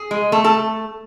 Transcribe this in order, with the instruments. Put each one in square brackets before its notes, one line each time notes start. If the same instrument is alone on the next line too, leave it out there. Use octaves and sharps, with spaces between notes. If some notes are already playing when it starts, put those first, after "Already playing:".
Already playing: [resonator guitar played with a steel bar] G#4
G#3
A3 A4
A4